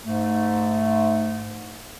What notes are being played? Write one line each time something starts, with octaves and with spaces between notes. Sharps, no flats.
G#2 A3